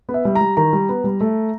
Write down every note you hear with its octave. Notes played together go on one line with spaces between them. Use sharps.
B3
E5
G3
A#5
G3
D#3 A#5
G3
B3
G3
A3